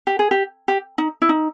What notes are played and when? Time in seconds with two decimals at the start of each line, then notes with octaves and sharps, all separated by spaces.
0.07 G4
0.19 G#4
0.31 G4
0.68 G4
0.98 D#4
1.22 E4
1.29 D#4